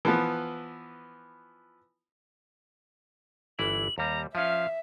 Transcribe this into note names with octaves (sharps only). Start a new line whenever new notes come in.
E3 F3 B3
G1 E3 E4 F#7
D#2 G3 A#5
F3 C#4 E5 F5